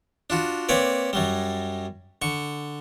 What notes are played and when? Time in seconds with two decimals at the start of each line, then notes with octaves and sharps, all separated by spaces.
0.30 D4 F4 F#4
0.69 A#3 C4 B4 C#5 D5
1.13 F#2 F#3 G3
2.22 D3 C#6